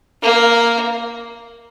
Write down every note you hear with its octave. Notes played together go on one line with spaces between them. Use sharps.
A#3